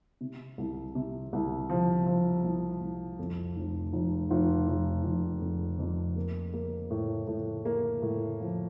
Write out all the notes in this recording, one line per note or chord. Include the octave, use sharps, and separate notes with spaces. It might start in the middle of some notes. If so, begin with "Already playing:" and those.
C3
C2
C3
C2
F3
F3
C2
C2
F2
F1
F1
F1
F1
F1
F2
F2
A#3
A#3
A2
A2
A#3
A2
F3